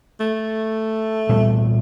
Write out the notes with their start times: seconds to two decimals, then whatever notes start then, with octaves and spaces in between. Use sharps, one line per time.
0.20 A3
1.29 A#2 G3 B3